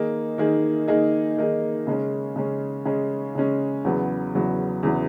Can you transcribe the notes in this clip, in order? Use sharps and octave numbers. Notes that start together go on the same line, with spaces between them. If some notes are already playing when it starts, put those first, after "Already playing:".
Already playing: D#3 A#3 D#4 G#4
D#3 A#3 D#4 G#4
D#3 A#3 D#4 G#4
D#3 A#3 D#4 G#4
C#3 G#3 C#4
C#3 G#3 C#4
C#3 G#3 C#4
C#3 G#3 C#4
E2 C#3 F#3 B3
E2 C#3 F#3 B3
E2 C#3 F#3 B3